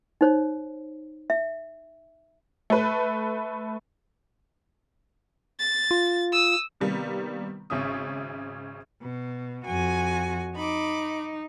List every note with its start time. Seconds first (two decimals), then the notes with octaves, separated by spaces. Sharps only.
0.21 D#4 C5 C#5
1.30 E5
2.70 A3 B4
5.59 A6
5.91 F4
6.32 D#6 E6
6.81 C3 D#3 G3 A#3 B3
7.70 G#1 C#3 C#4 E5 D#6
9.02 B2
9.66 F2 F#4 G#5
10.56 D#4 B5 D6